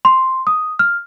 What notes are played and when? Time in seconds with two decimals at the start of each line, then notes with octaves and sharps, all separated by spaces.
0.05 C6
0.47 D#6
0.79 F6